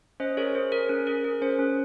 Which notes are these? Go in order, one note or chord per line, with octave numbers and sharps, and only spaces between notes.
C#4 C5 D#5
G#4 A#4 C#5
G#4 C5
G#4 A#4
C#4 A#4
G#4 A#4
G#4 A#4
C#4 C5
C#4